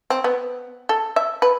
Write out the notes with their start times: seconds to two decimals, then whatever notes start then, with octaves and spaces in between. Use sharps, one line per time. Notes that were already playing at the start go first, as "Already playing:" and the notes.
0.10 C4
0.24 B3
0.89 A4
1.16 E5
1.42 B4